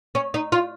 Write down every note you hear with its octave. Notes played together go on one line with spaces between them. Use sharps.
C#4
D#4
F4